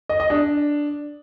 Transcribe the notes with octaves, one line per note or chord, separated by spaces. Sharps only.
D#5
D#5
D4